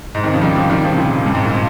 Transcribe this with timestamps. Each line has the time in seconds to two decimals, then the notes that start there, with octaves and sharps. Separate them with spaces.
0.15 G#2
0.23 C3 D#3
0.33 C#3 F3
0.42 D#3 G3
0.56 C#3 F3
0.70 D#3 G3
0.84 C#3 F3
0.93 C3
0.98 A#2 C#3
1.26 G2
1.35 G#2
1.45 A#2
1.54 C3